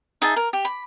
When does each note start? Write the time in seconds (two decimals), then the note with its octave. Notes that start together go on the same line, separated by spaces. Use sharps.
0.22 D#4 G#4 E5 A5
0.36 A#4
0.53 G4
0.65 B5